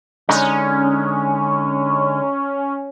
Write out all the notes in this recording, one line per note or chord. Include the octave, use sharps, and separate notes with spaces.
D3 G#3 C#4 D#4